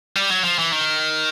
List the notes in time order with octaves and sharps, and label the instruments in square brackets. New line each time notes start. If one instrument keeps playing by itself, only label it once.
[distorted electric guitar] G3
F#3
F3
E3
D#3